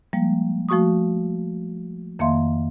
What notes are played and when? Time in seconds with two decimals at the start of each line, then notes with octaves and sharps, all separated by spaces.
0.13 F3 G3 G#3 A#3
0.69 F3 A3 F#4 C#6 D#6
2.19 F2 D#3 A#3 E5 F5 C6